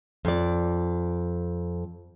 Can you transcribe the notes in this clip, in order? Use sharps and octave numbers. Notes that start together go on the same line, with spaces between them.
F2 D5